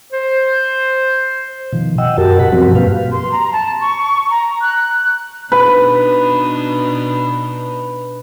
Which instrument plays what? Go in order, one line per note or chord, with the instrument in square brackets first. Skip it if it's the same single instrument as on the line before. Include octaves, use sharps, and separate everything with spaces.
[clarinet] C5
[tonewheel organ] B2 D#3 F3
D#5 F#5 G5 E6
F#2 F#4 G4 A#4 A5
B2 F#5 B5
G2 B2 F3 F#3 C4 F#4
G2 A#3 G4 B4 F5
[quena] C6
A#5
A5
C#6
A#5
F#6
[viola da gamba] B2 D4 D#4 [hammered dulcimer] B4